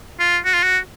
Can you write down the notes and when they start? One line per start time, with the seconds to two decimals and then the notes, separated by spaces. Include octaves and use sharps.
0.20 F4
0.45 F#4
0.54 F4
0.63 F#4